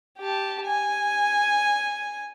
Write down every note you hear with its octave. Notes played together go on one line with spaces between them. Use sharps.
G4 A5
G#5